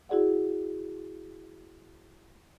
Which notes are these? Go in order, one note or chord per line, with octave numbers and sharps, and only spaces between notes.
E4 F#4 G#4 D5 F#5